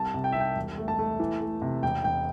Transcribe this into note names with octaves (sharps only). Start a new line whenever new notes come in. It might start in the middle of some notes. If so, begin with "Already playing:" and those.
Already playing: C2 A5
C3
G5
C2 E5
G5
E1
A3
A5
A3
E3
A3
C3
E1 G5
E1 G5